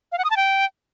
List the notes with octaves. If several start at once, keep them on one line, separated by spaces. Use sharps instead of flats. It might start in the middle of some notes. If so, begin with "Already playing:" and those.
F5
F#5
D#6
A5
G5